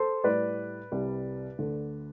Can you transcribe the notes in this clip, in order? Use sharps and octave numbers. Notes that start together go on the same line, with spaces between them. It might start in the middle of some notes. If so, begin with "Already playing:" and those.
Already playing: A4 C5
A2 G3 B4 D5
C2 C3 G3
D2 D3 A3